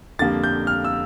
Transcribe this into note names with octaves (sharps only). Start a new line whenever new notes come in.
F2 D3 G3 A#3 A6
G6
F6
E6